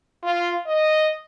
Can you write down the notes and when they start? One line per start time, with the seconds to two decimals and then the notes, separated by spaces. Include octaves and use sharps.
0.23 F4
0.67 D#5